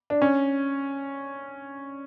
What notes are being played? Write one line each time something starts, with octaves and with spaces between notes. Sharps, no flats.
D4
C#4